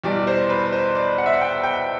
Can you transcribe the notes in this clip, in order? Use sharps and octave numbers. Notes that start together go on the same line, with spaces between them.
E2 B2 G3 D5
C5
B4
C5
D5
F#5
E5
F#5
G5
G5